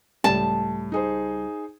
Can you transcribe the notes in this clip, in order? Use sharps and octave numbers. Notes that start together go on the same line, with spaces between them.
C#2 A2 G3 A5
D#4 G#4 C5